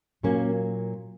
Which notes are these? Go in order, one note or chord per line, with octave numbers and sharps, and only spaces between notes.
A#2 F#3 A#3 C#4